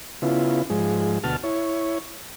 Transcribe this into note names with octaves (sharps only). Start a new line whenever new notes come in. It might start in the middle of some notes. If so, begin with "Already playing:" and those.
C#3 B3 E4 F4
G#2 F3 G#3
D2 B2 F#4 A5 F6
E4 C#5